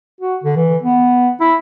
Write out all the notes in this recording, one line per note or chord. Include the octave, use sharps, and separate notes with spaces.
F#4
D3
E3
B3
E4